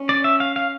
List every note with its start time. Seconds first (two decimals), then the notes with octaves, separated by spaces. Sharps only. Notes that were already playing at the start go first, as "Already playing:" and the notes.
Already playing: C#4
0.09 D5
0.24 E5
0.40 F5
0.56 F5